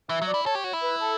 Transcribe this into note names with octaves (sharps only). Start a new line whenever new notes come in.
E3 E5
F#3
D5
E4
A4 C#5
G4
F#4
E4
B4
A4